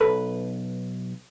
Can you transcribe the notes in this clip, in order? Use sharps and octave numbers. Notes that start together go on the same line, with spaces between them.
B1 F#2 A4 B4